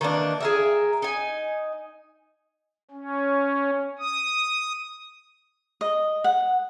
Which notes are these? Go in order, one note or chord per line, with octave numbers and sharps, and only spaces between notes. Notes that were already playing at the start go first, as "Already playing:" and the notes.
D#3 E3 A#3 D4
G#4 A#4 E5
D#4 G#5
C#4
D#6
D#5
F#5